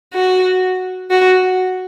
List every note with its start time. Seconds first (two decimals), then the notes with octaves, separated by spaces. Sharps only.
0.13 F#4
1.10 F#4